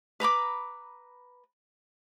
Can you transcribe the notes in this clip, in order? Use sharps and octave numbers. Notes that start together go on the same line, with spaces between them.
B4 A#5 B5 D6